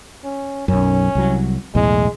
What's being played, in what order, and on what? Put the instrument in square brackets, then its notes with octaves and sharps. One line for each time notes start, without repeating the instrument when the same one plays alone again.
[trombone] C#4
[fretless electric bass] B1 F#2 [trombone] C#4
[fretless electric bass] C2 F#3
[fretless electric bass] B1 E2 A2 [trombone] G#3